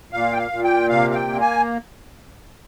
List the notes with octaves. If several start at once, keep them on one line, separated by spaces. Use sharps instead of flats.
A#2 F5
G5
F5
A#2
G5
C3 F5
F5
G5
A#3
G#5